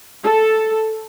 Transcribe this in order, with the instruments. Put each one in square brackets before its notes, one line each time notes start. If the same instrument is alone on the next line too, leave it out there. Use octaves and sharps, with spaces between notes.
[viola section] A4